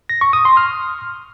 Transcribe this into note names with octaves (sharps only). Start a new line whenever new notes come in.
A#6
C#6
D#6
C6
F6